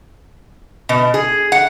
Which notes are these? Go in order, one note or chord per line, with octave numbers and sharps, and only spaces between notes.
B2
G#4
F#5